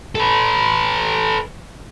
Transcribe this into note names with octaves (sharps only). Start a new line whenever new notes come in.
A4 B4